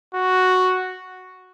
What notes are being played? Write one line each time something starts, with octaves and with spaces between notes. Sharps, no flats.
F#4